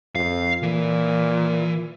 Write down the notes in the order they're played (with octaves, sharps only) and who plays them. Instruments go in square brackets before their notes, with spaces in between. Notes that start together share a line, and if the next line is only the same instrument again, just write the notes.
[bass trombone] F2 [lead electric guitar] F5
[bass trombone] A#2 [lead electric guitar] E3